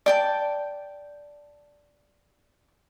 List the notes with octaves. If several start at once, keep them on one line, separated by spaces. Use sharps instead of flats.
D5 G5 A5